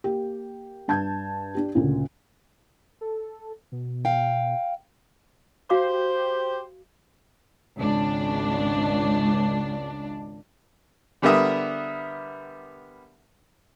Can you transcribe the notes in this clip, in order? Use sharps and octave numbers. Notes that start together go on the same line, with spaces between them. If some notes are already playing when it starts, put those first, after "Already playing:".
A#3 G4
G2 A5 G6 G#6
D4 G4
D2 A#2 C#3
A4
B2
F5 G5
F#4 G4 C5 F5 D6
G#1 C#2 D4
D3 G3 B3 A#4 E5 D#6